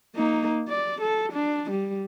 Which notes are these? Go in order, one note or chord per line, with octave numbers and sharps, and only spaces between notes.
A#3 D#4
D5
A4
D4
G3